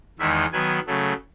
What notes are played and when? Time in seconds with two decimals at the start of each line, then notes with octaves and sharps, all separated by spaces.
0.19 E2 D#3 G#3 D#4 E5
0.52 D#3 F#3 B3 G#5
0.87 C#3 F#3 A3